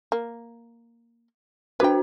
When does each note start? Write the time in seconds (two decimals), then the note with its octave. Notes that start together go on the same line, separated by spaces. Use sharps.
0.12 A#3
1.80 D4 F#4 B4 C5 G5